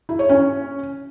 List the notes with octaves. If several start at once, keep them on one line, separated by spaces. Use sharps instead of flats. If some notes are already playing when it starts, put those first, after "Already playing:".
E4
C#5
C#4